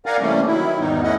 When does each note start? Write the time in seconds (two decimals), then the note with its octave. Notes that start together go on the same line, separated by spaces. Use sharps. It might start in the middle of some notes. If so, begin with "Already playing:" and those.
0.06 A#4 D5 F5 F#5 G#5 A#5
0.20 C3 E3 G3 A3 A#3 C#4
0.46 D#3 F#3 E4
0.79 E2 G#2 D#3 G3 B3 D#4
1.03 A3 B3 C#4 E4 D#5 F#5